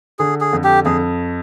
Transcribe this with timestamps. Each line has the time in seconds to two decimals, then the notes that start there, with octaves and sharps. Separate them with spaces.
0.19 D3 G#4
0.41 G#4
0.53 F2
0.64 G4
0.85 F2 G#4